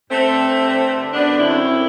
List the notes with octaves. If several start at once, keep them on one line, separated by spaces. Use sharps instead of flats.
G2 A3 C4
D3
G2
D3
G2
D3
F#2 B3 D4
D3
C4 E4
F#2
D3